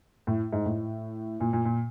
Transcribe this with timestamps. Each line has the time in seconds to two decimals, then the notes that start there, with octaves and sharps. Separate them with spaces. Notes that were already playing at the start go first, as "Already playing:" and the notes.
0.27 A2
0.53 G#2
0.66 A2
1.40 A#2
1.53 A#2
1.65 A#2